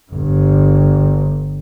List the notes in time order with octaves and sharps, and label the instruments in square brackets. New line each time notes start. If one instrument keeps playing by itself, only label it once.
[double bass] G1 G2